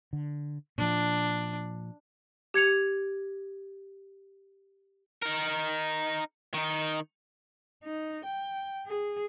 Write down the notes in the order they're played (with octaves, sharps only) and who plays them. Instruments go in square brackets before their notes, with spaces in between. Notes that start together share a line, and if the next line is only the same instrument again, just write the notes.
[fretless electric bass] D3
[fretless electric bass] A#2 F3 [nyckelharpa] D4
[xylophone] G4 G#6 C#7 F7
[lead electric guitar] D#4 A#4
D#3 D#4
[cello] D#4
G5
G#4